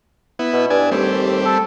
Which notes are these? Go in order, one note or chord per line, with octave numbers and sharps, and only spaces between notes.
B3 E4
B2
G2 D4 G#5
D#2 G3 A3 C4
A4